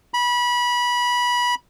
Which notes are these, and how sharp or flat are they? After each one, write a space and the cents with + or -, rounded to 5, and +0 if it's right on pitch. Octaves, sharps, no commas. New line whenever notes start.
B5 -20